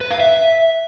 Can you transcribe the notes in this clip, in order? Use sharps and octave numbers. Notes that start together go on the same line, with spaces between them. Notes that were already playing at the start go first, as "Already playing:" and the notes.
B4
F5
E5